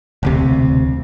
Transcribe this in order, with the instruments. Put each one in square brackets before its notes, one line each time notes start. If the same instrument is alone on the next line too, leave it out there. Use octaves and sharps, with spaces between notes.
[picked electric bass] E1 D2 C3